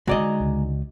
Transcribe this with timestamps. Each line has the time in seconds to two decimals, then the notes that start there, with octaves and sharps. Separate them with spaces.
0.07 D3 G#3 D#4 F#4 D5 D#5 G#5 A#5
0.40 C#2